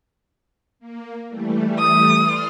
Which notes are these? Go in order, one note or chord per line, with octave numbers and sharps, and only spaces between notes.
A#3
E3 G3 A3
D#6
D5 C6 F6